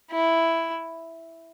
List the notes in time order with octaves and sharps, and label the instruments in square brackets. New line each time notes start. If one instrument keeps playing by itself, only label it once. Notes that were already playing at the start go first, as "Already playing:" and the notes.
[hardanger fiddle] E4